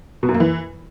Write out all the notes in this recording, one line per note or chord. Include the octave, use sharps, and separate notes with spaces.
B2
F#2
A#3
E3